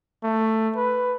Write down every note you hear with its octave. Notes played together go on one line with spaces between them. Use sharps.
A3
B4